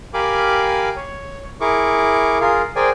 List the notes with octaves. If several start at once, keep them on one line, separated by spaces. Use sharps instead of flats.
G4 A#4 F5 G#5 B5 D6
C#5
E4 G#4 A#4 C#6 D6
F4 G#4 A#4 F5
G#4 A#4 C5 D5 G5 G#5